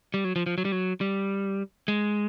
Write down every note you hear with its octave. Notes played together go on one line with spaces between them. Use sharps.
G3
F#3
F3
F3
F#3
G3
F#3
G3
G#3